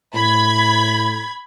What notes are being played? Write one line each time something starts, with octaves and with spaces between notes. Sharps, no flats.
A2 B5 G#6